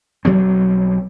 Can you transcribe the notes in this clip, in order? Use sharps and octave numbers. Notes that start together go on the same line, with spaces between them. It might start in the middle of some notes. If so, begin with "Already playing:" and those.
B1 F#3 G3 C4